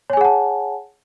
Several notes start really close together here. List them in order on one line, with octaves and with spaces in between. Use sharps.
C#5 G#5 G#4 F#5 A5